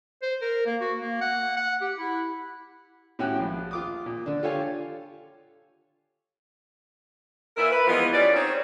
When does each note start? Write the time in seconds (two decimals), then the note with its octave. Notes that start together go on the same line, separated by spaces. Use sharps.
0.22 C5
0.42 A#4
0.66 A#3
0.81 F#4
1.00 A#3
1.21 F#5
1.57 F#5
1.81 G4
1.98 E4
3.19 A2 C#4 F#4 G4 G5 F#6
3.40 A#1
3.71 F4 D6 D#6
4.06 A#2
4.26 D3 D4
4.43 F4 G4 A4 C#5 F5 G#5
7.57 A#2 A#4 B4 E5
7.71 B4
7.88 E3 F3 G#3 B3
8.13 E3 G3 C#4 D5
8.35 C4 D#4 C#5